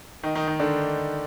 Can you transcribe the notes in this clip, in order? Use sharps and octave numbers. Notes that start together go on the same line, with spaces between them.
D#3 D#4
D#3 D#4
D#3 D#4
D3 D4